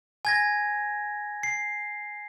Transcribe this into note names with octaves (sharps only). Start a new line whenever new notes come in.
G#5 G#6 A#6
C7